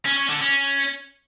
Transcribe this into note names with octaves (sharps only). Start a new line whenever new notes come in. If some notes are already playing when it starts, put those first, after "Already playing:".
C#4
C#4
D3
C#4